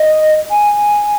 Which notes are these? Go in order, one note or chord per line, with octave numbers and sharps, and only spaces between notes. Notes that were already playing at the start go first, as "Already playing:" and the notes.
Already playing: D#5
G#5